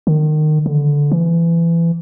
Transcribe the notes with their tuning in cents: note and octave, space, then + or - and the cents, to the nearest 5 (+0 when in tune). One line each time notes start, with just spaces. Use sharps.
D#3 -25
D3 -15
E3 +25